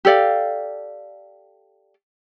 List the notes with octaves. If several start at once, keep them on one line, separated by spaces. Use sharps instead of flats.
G4 A4 D5 F5